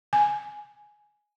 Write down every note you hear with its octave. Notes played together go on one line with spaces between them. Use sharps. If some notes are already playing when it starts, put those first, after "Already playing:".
G#5